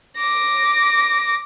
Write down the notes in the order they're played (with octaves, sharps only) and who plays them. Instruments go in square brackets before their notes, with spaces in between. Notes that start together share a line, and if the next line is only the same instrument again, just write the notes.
[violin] D6 A#6